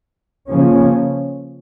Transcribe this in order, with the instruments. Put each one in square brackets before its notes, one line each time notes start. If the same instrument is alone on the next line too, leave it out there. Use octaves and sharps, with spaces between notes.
[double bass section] C#3 F3 A#3 C#4